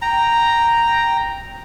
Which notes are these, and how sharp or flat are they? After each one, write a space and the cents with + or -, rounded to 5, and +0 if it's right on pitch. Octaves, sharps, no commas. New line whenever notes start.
G5 +0 A#5 +0